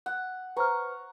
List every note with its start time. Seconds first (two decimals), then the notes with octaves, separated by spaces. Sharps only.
0.06 F#5
0.56 B4 C5 A#5 C#6 F6